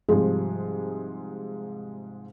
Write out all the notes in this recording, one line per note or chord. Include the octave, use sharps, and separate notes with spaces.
G#2 C3 F3 G3 G#3